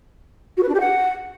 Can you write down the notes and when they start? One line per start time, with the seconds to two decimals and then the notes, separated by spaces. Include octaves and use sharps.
0.57 F#4
0.62 B4
0.68 D4
0.74 G4
0.80 F#5